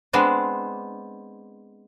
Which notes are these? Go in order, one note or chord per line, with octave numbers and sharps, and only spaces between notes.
G#3 B3 C4 D4